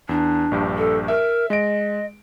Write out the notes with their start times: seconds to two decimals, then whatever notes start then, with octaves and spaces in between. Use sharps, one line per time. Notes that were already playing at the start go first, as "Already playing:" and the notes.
0.09 E2 D4
0.52 A#1 G2 G4
0.78 A4
1.08 A#4 E5
1.50 G#3 D#5 D7